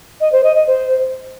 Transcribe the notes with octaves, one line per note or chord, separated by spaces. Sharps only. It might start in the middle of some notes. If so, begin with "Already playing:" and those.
D#5
C5
D#5
D#5
C5